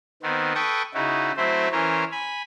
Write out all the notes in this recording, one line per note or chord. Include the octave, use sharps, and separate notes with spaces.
D#3 B3 C4
A4 B4 G5 C#6 D#6
C#3 D#4 E4 F#4
F#3 A3 C4 E4 C5 E5
E3 C#4 A#4 C5 C#5
G#5 B5